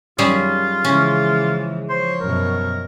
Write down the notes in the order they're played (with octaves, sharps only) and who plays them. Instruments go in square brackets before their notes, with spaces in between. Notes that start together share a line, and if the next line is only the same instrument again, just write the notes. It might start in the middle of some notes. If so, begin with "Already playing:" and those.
[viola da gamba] F#2 D#3 F#3 [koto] G3 C#4 G#4 [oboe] F4
[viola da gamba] C#3 F3 G#3 [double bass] E3 [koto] C#4
[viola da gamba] F3 C#5 [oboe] C5
[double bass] F#2 B2 [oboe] A#4